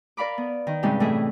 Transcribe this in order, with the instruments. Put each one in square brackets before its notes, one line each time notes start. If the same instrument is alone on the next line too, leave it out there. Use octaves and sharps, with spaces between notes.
[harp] A#4 D5 F5 B5 D6
B3
D#3
G2 C3 G#3 C#4 D#4 G4
A2 E3 A3 G#4 D#5 E5